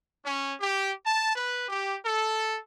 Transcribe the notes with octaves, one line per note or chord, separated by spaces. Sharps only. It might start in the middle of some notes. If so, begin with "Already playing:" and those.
C#4
G4
A5
B4
G4
A4